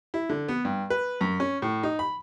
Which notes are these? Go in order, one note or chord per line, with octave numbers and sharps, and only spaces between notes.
E4
D3
B3
G2
B4
F#2
C#4
A2
D#4
B5